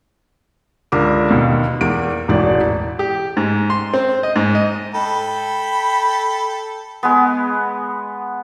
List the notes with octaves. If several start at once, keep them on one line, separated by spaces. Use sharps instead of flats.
C#2 D3 A#4 D6
D#2 B2
E2 A#3 D7
E1 A1 E3 D5
G4
G#2
C6
C4
D#5
G#2
D#5
A4 G5 B5
G#3 B3